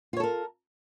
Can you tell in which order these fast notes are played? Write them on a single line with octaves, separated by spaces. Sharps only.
F4 C#5 A4 A#4